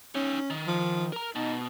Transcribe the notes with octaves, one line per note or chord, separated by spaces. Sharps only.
C#4 D#4 C#5
D#3
F3
A#4 A#5
B2 D#4